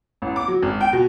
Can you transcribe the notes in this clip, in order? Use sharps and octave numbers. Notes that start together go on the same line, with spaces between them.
A1
D6
F#3
G#1
G5
B2